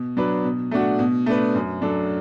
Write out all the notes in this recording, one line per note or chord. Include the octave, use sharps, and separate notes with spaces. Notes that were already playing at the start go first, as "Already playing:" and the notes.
Already playing: B2
F#3 D4 B4
B2
A3 D4 F#4
B2
A3 D4 B4
F#2
F#3 D4 A4